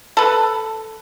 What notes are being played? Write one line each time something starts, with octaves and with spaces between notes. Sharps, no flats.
A4 B4